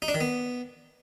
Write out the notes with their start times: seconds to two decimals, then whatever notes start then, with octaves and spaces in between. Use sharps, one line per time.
0.02 D#4
0.08 D4
0.14 D#3
0.21 B3